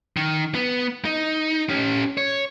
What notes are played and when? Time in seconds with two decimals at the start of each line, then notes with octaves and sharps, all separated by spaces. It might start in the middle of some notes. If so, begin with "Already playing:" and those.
0.17 D#3
0.55 B3
1.05 D#4
1.70 C#4 G4
2.17 C#5